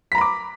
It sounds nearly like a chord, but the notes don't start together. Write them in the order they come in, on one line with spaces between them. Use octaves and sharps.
B6 A#5 B5 D6